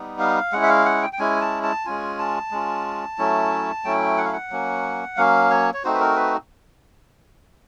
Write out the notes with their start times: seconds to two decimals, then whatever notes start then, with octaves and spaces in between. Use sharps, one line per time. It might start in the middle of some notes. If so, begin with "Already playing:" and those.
Already playing: G3 B3 D#4
0.19 F5
0.52 G#3 C#4 E4 F#5
0.62 E5
0.69 F5
0.85 F#5
1.02 G5
1.13 G5
1.19 G#3 C#4 E4 G#5
1.41 A5
1.63 A5
1.85 G#3 C#4 F4 G#5
2.19 A5
2.51 G#3 C#4 F4
3.18 F#3 A3 C#4 E4
3.84 F#3 A3 C#4 E4 G5
4.18 F#5
4.25 F5
4.33 F#5
4.50 F#3 A#3 C#4
5.17 F#3 A#3 C#4 F5
5.50 C#5
5.74 C#5
5.84 A3 C4 D#4 F#4 C5
5.94 B4
6.00 A#4
6.16 B4